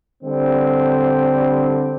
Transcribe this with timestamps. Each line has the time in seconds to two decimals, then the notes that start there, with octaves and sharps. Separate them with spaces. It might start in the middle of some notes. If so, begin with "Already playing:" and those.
0.23 D3 G3 C4